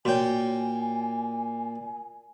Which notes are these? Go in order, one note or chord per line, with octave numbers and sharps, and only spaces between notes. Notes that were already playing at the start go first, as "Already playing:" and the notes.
A#2 F#4 C#5 G5 G#5